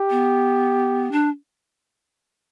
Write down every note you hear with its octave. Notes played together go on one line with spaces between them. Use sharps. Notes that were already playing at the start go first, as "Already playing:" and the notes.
Already playing: G4
B3
D4